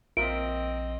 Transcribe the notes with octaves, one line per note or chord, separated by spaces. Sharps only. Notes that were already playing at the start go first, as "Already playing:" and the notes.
A#1 C4 F4 A#4 D#5 E5 D7